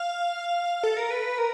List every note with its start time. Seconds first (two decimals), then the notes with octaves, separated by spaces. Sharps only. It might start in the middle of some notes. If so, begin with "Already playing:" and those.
Already playing: F5
0.83 A4
0.97 A#4
1.11 B4
1.38 A#4